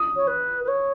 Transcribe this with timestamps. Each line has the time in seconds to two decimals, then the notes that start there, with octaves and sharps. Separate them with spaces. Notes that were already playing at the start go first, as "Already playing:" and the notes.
Already playing: D#6
0.16 C#5
0.27 B4
0.64 B4
0.68 C#5